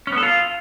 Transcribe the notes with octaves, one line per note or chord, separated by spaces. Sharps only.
C#4
B3
A4
F4